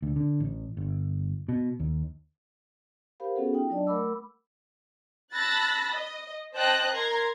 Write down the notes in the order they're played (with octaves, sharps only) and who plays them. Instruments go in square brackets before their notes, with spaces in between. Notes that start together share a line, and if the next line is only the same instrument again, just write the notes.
[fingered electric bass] D2
D3
A1
G1
B2
D#2
[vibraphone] G4 A#4 C5 F5 B5
B3 C#4 F#4 G#4 A4 F#5
D#4 F4 G5
F#3 D4 D5 D#5 A5
A3 A#4 F#5 B5 D6 E6
[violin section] A5 B5 E6 F#6 A6 A#6
D#5
C5 D#5 G5 A5 F#6 A#6
A#4 A#5 C6 G#6